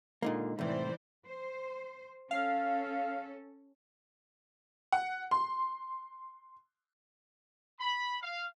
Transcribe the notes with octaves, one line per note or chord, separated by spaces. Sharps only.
A#2 D3 G#3 A#3 D#4
C2 A2 E3 C5 D5
C5
C#4 A4 F5
F#5
C6
B5
F5